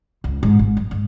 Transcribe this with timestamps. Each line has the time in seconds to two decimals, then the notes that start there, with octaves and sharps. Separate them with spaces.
0.24 C#2
0.43 G#2
0.59 G#1
0.77 F#2
0.91 G#2